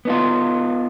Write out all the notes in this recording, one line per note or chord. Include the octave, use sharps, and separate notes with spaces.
B3 D#4 F4